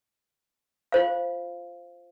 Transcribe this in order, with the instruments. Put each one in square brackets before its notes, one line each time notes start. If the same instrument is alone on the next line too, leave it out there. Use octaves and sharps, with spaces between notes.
[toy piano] F4 C5 F5